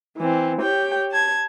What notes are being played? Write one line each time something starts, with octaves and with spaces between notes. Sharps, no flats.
E3 C4
G4 C#5 G5
A5 G#6